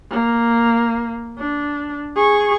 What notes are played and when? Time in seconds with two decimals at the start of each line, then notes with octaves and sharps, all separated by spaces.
0.10 A#3
1.38 D4
2.16 G#4 C#6